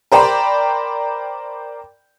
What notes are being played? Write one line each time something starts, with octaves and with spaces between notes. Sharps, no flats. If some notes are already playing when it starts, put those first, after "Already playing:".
A#4 C5 D5 G5 A#5 B5